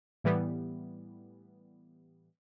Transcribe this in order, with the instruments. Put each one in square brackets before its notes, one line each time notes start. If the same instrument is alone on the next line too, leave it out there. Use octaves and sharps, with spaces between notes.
[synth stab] A2 E3 G3 B3